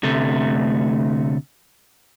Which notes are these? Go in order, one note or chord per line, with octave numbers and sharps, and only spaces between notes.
D2 C3 A3